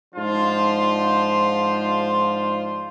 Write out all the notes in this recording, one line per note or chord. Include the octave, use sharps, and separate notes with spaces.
G#2 F3 D4 F4 C5